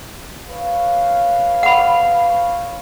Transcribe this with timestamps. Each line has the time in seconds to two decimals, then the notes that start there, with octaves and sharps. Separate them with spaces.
0.46 B4 C#5 F5
1.63 F#5 B5